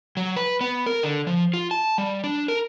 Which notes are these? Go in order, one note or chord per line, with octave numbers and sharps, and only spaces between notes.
F#3
B4
B3
A#4
D3
F3
F4
A5
G3
D4
A#4